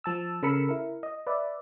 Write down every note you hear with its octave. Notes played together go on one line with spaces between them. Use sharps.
F3 A5 E6
C#3 A4 A#4 B5 E6 C#7
E4 A#4
D#5
B4 D5 E5